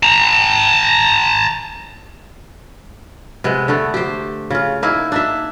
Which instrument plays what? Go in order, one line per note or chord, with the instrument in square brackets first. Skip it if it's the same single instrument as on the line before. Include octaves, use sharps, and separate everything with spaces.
[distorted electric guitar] A5 A#5
[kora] C3 G#3 B3
D3 A3 B3
G4 C5
C#3 F4
A#3 D#4 E4 G#4
D4 D#4 E5